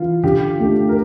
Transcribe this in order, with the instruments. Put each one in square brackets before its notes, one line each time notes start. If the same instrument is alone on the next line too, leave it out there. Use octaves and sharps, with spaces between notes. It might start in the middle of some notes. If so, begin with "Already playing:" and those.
Already playing: [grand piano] E3 [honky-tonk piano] F4
[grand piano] D3 [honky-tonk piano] G4
[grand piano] A3 D4
[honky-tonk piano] A#4